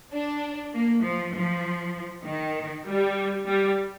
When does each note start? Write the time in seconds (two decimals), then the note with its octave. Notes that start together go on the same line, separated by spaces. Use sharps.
0.12 D4
0.74 A#3
1.04 F3
1.34 F3
2.25 D#3
2.86 G3
3.46 G3